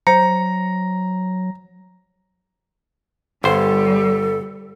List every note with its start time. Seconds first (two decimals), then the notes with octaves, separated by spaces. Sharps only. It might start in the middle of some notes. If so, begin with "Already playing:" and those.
0.07 F#3 C5 A#5 C#7
3.44 G1 G3 A4 C5